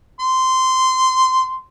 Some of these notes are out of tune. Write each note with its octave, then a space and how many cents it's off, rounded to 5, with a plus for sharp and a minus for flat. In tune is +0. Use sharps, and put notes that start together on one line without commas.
C6 -15